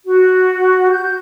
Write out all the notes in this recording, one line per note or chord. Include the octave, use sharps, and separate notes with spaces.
F#4
G6